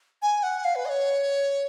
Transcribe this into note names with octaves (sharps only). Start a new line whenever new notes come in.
G#5
F#5
F5
B4
D#5
C#5